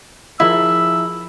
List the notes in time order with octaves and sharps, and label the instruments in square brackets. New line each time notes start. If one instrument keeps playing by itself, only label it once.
[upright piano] F3 G#4 A#4 [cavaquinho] E4 [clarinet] E6